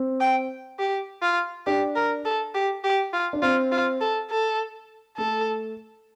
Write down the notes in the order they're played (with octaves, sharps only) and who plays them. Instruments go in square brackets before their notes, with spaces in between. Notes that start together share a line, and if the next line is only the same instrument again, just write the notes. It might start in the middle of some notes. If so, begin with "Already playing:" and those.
Already playing: [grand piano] C4
[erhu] G5
G4
F4
[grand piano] D4 [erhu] G4
[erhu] A#4
A4
G4
G4
F4
[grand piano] D4
[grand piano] C4 [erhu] F4
[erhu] F4
A4
A4
[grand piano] A3 [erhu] A4